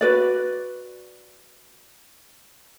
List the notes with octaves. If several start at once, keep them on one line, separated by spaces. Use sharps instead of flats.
F#4 B4 D5